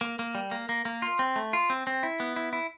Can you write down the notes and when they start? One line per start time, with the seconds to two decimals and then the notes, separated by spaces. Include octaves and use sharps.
0.01 A#3
0.19 A#3
0.35 G3
0.51 A#3
0.69 A#3
0.85 A#3
1.02 F4
1.19 C4
1.36 A3
1.53 F4
1.70 C4
1.87 C4
2.03 E4
2.20 B3
2.36 E4
2.53 E4